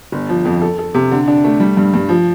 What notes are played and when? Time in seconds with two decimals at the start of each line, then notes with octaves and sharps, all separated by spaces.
0.12 G1
0.29 F3
0.45 F2
0.61 A4
0.79 A4
0.94 C3
1.11 D3
1.28 D4
1.44 A3
1.60 G3
1.77 G2
1.94 G2
2.09 F3